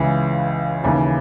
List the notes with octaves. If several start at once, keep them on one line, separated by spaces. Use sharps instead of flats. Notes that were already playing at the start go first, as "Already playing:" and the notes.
Already playing: C#2 C#3 E3
D#2 C#3 E3